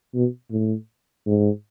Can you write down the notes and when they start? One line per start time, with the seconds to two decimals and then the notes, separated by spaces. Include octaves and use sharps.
0.15 B2
0.51 A2
1.27 G#2